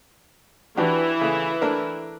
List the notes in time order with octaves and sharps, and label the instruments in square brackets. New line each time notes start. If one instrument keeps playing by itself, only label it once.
[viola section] E3 E4 [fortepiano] D4 F#4 G4
[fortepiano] C#3 A3
A3 D4 A#4